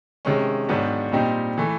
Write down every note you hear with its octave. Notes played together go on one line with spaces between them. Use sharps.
C3 D#3 G#3 C#4
G#2 D#3 F#3 B3 D4
A#2 G3 C4 D#4 G4
E3 A3